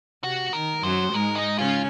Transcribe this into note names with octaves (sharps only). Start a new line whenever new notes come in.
C3 F#4
D#3 A#4
F#2 F#3 C5
G#2 G#3 A#4
D#4
C#3 C#4 F4